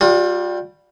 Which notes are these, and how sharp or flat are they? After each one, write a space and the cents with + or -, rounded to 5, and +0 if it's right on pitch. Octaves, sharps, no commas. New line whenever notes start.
G3 +0 F4 +40